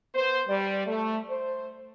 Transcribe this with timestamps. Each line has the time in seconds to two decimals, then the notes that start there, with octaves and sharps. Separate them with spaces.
0.14 B3 C5
0.46 G3 D5
0.85 A3
1.28 C5